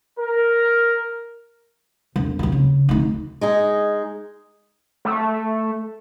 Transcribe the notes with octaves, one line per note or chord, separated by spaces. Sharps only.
A#4
E1
D#2 D#3
C#3
D2 D#4
G#3 D#4 G#4
A3